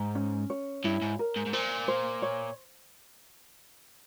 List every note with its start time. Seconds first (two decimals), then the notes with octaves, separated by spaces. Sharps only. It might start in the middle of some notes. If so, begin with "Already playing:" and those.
Already playing: G#2 A#5
0.15 C#4
0.50 C#5
0.84 G2 E4
1.02 G#2
1.19 A#4
1.36 G#2
1.46 G#2
1.53 A#2 C5
1.88 C5
2.22 C#5